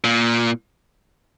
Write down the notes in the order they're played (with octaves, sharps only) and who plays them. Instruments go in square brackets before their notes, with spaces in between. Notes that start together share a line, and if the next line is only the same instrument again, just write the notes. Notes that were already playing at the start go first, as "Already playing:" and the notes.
[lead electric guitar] A#2